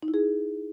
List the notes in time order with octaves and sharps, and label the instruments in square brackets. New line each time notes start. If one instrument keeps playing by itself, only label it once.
[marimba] D#4
E4
G#4